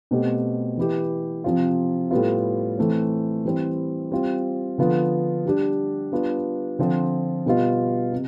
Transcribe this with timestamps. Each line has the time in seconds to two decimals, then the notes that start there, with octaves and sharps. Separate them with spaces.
0.11 B2 A3 C4 G4
0.77 E3 B3 E4 G4
1.44 C3 F3 C4 F4
2.11 A2 G3 B3 F4
2.78 E3 A3 C4
3.45 E3 G3 C4 E4
4.11 G3 C4 F4
4.78 D3 F3 B3 F4
5.45 G3 D4 G4
6.12 G3 B3 D4 F4
6.79 D3 F3 C4 F4
7.46 B2 G3 B3 F4
8.13 C3